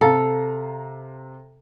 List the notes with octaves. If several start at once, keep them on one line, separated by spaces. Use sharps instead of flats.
C3 A4 F5 A#5